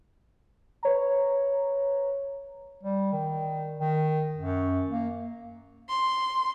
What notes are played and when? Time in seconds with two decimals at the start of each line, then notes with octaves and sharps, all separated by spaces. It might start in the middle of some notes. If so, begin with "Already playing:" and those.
0.83 B4 C#5 A#5
2.83 G3
3.12 D#3
3.79 D#3
4.37 F#2
4.89 A#3
5.89 C6